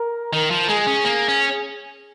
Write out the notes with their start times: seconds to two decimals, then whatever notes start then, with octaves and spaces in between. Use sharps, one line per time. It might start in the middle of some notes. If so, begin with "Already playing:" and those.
Already playing: A#4
0.33 D#3 A#4
0.51 F3
0.68 G#3 G#4
0.87 C#4
1.05 A#3
1.28 C#4